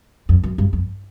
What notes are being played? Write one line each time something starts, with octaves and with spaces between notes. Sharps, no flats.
F2
F#2
G2
F2